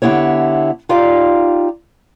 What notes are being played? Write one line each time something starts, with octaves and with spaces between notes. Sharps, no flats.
D3 B3 E4 G4 C#5
D#4 F4 G4 D5 F5